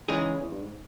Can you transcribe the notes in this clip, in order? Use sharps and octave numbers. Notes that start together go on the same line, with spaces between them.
C#3 E3 G#3 D#4 G#4
E2
G2
G#2